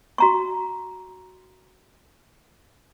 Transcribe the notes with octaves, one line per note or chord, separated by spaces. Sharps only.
F#4 A#5 C#6